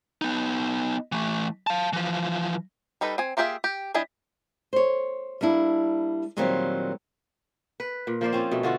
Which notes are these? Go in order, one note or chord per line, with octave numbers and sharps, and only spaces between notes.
B3 D#4
E3 A3
F5 A5
E3 F3
G3 D#4 A4 B4
C4 G#5
A#3 F4 G4 G#4 E5
G4
G3 D4 E4 D#5 G#5
C5 C#5
G3 A#3 D4 E4
A#2 D#3 F#3 G3 A#3 C4
B4
A#2
F3 A#3 C5 D5
C4 C#4 F4
B2 A3
D3 F4 F#4 A4